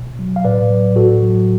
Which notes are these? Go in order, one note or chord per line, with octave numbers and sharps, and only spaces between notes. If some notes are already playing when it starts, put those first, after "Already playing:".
Already playing: B2
F#3
F5
A2 B4 D5
F#3
A2 F#4 A4
F#3